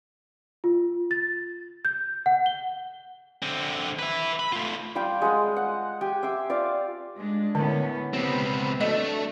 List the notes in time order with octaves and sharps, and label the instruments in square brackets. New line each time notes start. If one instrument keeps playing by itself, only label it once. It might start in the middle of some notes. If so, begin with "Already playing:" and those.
[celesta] F4
A6
G6
F#5
G7
[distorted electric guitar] D3 C4
B4 E5
B5
A3 F4
[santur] G3 F4 G4 G5
G#3 F4 D#5 F#5
F#5
G4 G5 G#5
E5 C6 D6
F4 D5 F5
[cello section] G#3 D4
[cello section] A2 B3 C#4 [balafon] D3
[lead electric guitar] C#2 C4 [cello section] B3 G4
[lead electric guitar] A3 [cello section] D4 F#4 [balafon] D#5